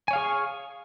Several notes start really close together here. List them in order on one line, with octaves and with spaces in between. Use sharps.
G#5 C#5 F5 G#4 C#6